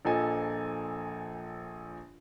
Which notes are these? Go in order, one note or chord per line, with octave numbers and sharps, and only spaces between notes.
A#1 A#2 F3 A4 D#5 G#5